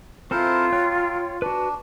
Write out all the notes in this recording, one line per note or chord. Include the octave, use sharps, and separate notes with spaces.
C4 E4 F4 A4 A#4 C5
F#3 C#5 G5 F#6
D4 F#4 B4